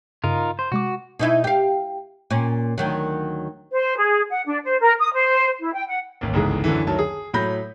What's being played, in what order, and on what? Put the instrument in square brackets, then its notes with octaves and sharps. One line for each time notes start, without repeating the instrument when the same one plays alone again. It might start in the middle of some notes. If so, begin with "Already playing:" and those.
[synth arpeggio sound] G2 C#3 [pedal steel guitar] D#4 F4 A#4
[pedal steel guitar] C5
[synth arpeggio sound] C3 G#3 D6 [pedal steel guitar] F#4
[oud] B2 D#4 E4
G4 F5
A#2 C#4
D2 D#3 F#3
[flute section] C5
G#4
F#5
D4
C5
A#4
D#6
C5
E4
G5
F#5
[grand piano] A1 D#2
G1 C#2 G#2 E3 G#4
F#2 D3 E3
D2 D#3 F#3 A5
G#4
A2 F#3 B5 G6 A#6